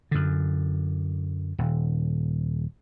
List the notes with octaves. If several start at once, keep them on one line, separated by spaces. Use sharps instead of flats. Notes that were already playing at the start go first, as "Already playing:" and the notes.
F#2 D3
D#1